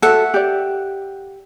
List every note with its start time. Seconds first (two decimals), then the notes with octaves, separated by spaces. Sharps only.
0.02 F#4 A4 E5 F#5
0.34 G4 D5